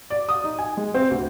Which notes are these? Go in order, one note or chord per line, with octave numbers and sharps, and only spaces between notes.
D5
D#6
D#4
G#5
G#3
C4
D2